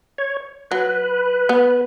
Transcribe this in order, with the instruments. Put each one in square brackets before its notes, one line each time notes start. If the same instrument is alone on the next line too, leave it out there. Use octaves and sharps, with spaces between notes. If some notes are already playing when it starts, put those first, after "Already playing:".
[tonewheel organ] C#5
[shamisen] F#3 [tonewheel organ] B4
[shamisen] B3